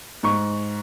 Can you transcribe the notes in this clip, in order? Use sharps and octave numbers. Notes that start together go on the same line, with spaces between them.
G#2 C#6